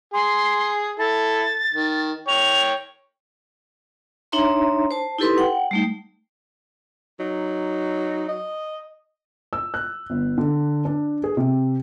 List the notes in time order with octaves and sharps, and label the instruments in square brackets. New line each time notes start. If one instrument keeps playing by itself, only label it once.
[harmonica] G#4 [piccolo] C6
[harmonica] E4 A4 [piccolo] A6
[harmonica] D#3
[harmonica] C#5 G5 [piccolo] F7
[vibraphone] D4 D#4 C#5 E5 A#5 C6
C5 A5
D#4 E4 G4 A4 B4 C6
F#5 G5
G3 A3 D#4
[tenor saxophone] F#3 [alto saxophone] D#4
[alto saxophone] D#5
[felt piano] E6
F#6
G1
D3
D4
G#4
C3